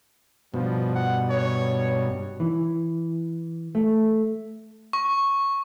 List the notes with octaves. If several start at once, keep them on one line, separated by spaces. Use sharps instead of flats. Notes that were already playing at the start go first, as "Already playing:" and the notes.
G2 B2 F3
F#5
C#5
E3
A3
C#6